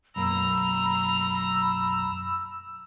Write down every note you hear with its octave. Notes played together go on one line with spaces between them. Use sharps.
B1 F#2 A#3 A#5 B5 E6